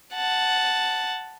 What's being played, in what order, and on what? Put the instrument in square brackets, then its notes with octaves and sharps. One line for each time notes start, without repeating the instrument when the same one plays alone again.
[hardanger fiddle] F#5 A5